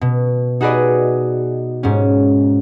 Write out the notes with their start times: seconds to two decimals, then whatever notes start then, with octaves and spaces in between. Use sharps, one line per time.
0.01 B2
0.61 D#4 F#4 G#4 B4 D5 D#5
1.83 G#2 C#4